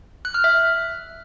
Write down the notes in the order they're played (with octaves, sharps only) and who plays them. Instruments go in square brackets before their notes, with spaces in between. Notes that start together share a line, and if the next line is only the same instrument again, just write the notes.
[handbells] F#6
F6
E5